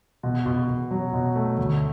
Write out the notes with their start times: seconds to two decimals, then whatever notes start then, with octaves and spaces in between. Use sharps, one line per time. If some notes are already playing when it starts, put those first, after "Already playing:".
0.23 B2
0.46 B2
0.68 B2
0.91 F#3
1.13 B2
1.35 A3
1.58 D2